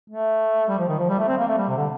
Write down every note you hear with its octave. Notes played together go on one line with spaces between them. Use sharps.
A3
G3
F3
D#3
F3
G3
A3
C4
A#3
A3
G3
C3
D3